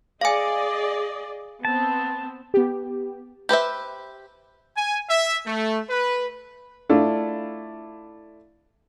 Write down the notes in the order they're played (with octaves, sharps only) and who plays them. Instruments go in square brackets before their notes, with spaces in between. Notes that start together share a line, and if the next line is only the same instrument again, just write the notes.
[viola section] G#4 D5 D#5 [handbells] F5 G#5
[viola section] B3 C4 [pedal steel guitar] A5
[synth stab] B3 G4
[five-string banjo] G4 B4 C5 E5
[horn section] G#5
E5
A3
B4
[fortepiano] A3 D4 E4 F4